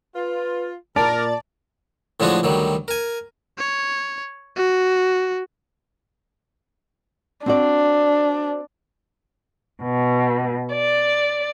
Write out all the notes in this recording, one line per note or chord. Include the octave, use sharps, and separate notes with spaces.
F4 B4
A#2 A#4 D5 A5
A2 D3 F3 G#3 D4 F#4
D2 D#3 F#3 G3
A#4 G#5
C#5
F#4
C4 D4 F#4 D5
B2
D5